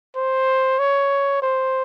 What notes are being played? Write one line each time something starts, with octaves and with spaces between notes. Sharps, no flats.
C5
C#5
C5